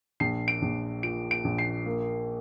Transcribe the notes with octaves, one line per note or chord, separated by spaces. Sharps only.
A#1 C7
D7
A#1
A#2 D7
D7
A#1
C7
A#3